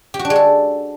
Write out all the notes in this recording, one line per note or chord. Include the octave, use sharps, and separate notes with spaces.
G4
F#4
D4
G#3
A4